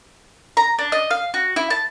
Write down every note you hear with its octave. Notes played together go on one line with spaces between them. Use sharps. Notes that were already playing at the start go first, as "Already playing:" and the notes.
A#5
D4
D#5
F5
F#4
E4
A5